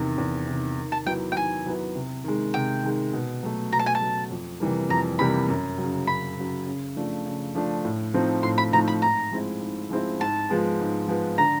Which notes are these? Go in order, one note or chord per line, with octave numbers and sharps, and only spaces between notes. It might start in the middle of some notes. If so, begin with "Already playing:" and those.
Already playing: E2 C3 D#3
E2
C3 D#3
D#3
A5
F#3 B3 E4 G5
G5
D#3 G#5
F#3 B3 E4
C3
D#3 G#3
C3 G5
D#3 G#3
B2
F#3 A3
B2 A#5
A5
G#5
A5
F#3 A3
F2
C3 E3 G3 A#3
F2 A#5
C3 E3 G3 A#3 B5
F#2
F#3
C#3
F#2 B5
C#3 F#3
C#3
F3 A3 D4
C#3
F3 A3 D4
A2
F3 A3 C4 D#4
A2 C6
B5
F3 A3 C4 D#4 A#5
B5
G#2 A#5
F3 G#3 C4 E4
G#2
F3 G#3 C4 E4
G#2 A5
F3 G#3 B3
G#2
F3 G#3 B3
D3 A#5